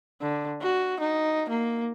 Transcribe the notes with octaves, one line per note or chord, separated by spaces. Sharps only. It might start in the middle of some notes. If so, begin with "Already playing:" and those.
D3
F#4
D#4
A#3